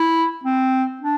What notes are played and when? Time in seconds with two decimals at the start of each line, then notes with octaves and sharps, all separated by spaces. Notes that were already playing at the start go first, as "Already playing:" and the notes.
Already playing: E4
0.44 C4
1.01 D4